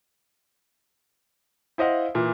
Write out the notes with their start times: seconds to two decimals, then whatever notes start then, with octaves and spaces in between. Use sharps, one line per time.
1.78 E4 C5 D#5 F5 F#5
2.15 A#2 E3